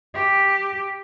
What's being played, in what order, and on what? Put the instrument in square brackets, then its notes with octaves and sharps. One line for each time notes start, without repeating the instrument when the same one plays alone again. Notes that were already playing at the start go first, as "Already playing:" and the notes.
[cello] G4